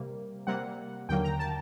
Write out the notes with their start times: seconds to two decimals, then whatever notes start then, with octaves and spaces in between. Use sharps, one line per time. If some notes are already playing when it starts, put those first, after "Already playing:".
Already playing: C3 G3 A#3
0.47 C3 G3 A#3 F#5
1.09 D#2 D3 F#3 A#3 G5
1.24 A#5
1.39 A5